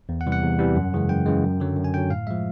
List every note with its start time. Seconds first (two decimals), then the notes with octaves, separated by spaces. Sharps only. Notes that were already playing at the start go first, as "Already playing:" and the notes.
0.09 E2
0.21 F#5
0.27 C3 E3 G3
0.32 F#5
0.42 E2
0.59 C3 E3 G3
0.76 F#2
0.94 C#3 E3 G#3
1.09 F#2 G5
1.26 C#3 E3 G#3
1.44 F#2
1.60 D3 F#3
1.77 F#2
1.84 G#5
1.94 D3 F#3 G5
2.10 A2 F5
2.27 F3 G#3 E5